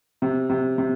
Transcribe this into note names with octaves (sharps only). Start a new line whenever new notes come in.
C3
C3
C3